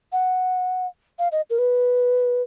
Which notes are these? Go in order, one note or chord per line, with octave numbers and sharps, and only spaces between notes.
F#5
F5
D#5
A#4
B4